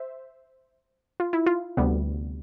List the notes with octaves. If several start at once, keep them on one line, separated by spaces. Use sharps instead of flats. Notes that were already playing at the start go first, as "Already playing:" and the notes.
Already playing: C5 E5
F4
E4
F4
D2 C3 G3 B3